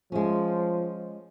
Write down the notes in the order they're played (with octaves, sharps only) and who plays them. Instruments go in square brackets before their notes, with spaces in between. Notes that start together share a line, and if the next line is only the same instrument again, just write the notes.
[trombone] F3 [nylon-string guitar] G#3 C#4